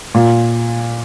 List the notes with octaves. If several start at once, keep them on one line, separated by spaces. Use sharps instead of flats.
A#2